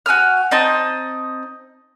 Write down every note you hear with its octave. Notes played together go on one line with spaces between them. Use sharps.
F#4 G#5 E6 F6
C4 D#4 D#5 A5